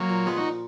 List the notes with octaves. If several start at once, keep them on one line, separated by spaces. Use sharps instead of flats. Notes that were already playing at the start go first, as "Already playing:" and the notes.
Already playing: F#3 A#3
A#2
F3 G#3 B3
D#4 F#4
A#2